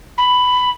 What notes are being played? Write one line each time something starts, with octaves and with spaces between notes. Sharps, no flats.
B5